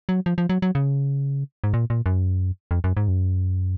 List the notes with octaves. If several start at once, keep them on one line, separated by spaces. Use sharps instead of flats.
F#3
F3
F3
F#3
F#3
C#3
G#2
A#2
A#2
F#2
F2
F#2
G#2
F#2